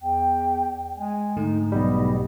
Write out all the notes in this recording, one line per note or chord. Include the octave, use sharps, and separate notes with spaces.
E2 G5
G#3 G#5
G#2 D3 A3 D#4
B1 G3 B3 D#5